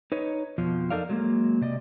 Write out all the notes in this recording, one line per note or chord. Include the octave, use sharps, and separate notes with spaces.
D#4 B4 C#5
F2 B2 F3
D#4 A4 A#4 D5 F5
F#3 G#3 A#3
C3 D5 D#5